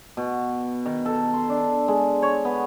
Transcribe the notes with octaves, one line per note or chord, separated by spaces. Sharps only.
B2
D#3
A4
C6
D4
G#3
C#5
B3